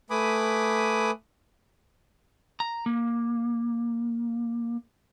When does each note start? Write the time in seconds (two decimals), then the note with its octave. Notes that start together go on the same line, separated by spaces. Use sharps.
0.10 A3 B4 G#5 B5 D6 D#6
2.60 A#5
2.86 A#3